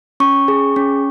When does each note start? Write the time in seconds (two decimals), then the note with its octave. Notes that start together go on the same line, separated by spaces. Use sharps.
0.20 C#4 C#6
0.48 G#4
0.76 C#4